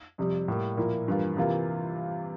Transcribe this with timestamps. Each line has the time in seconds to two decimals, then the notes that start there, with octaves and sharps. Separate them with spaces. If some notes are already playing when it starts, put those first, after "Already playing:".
0.18 F2 C3 G3
0.48 A2 G3 A#3
0.77 A#2 F3 A#3 E4
1.08 G2 E3 A#3 F4
1.37 C3 E3 A#3 F4